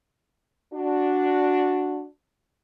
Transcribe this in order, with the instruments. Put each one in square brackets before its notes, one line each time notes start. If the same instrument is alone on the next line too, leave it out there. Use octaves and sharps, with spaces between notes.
[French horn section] D4 F#4